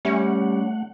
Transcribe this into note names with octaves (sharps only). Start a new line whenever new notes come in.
G3 A3 C#4 F#5